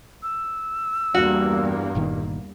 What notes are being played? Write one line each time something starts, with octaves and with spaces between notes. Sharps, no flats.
E6
E2 G2 A#3 F#4
G1 A#2 D#3